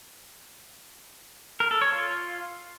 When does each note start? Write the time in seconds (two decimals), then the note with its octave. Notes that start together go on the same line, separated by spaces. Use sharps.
1.60 A#4
1.71 A4
1.81 C#5
1.92 F4